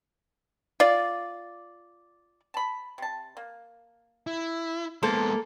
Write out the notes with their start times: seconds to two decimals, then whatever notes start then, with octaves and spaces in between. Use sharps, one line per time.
0.80 F4 D5
2.54 A5 B5
2.98 C3 A5
3.37 A#3
4.27 E4
5.03 G#3 A#3 B3 A4 C5